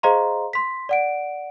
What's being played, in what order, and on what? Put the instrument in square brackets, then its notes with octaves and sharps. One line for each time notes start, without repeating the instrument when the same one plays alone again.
[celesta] G#4 C5 D#5 F5 A#5 C6
C6 B6
D5 F#5 D7